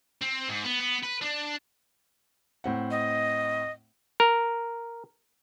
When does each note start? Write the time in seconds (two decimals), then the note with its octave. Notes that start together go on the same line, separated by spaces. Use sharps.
0.21 C4
0.49 G#2
0.64 B3
0.81 B3
1.03 B4
1.22 D4
2.64 A2 C4 F#5
2.91 D#5
4.20 A#4